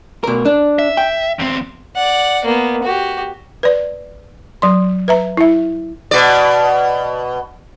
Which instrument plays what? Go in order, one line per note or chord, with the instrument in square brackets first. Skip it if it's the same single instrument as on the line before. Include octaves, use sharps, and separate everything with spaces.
[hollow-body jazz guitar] B2 A#4
D4
[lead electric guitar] E5
[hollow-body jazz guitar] G5
[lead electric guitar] E2 C4
[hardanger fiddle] D5 F#5
A#3 B3
F#4 G4
[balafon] B4 D5
F#3 C6
B4 E5 A#5
E4 E5
[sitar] B2 D5